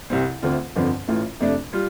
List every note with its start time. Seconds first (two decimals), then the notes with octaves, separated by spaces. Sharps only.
0.10 C2 C3 G3 C4
0.42 D2 D3 A3 C4 F4
0.76 G1 F2 D3 F3 C4
1.08 A1 A2 A3 F4
1.40 F2 C3 A3 D4
1.73 G3 F4